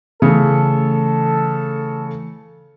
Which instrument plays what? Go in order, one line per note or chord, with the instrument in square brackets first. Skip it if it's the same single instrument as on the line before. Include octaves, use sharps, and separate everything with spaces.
[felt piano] C#3 [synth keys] E3 A3 C#7 [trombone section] A4